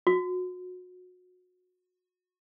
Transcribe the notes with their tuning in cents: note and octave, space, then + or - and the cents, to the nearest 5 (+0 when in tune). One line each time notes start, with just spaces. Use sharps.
F#4 -30